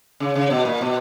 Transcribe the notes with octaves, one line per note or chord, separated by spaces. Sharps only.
C#3
C#3
B2
A#2
B2